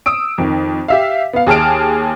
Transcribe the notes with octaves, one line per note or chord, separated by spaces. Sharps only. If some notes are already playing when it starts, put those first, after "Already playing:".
D#6 E6 D7
F2 D#3
G4 E5 F5
B3 F5
D#2 G#4 A5 F6 D7